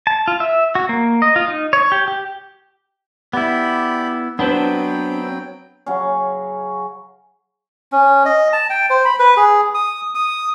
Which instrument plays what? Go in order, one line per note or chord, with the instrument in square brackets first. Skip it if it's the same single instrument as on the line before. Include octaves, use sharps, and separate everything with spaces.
[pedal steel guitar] A5
F4
E5
F#4
A#3
D#5
F4
D#4
C#5
G4
G4
[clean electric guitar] B3 E4 [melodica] G4 D5 B5
[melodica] F#3 G5 [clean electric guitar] B3 C4 [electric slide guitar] D4 B4 C5
[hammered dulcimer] C#3 F#3 C#4
[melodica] C#4
D#5
A5
G5
C5
B5
B4
G#4
D#6
D#6